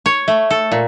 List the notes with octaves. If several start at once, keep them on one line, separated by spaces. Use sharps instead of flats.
C#5
A3
A4
A#2